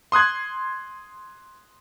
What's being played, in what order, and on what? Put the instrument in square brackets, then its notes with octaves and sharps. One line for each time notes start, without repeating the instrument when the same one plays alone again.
[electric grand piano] C6 D#6 F#6 G#6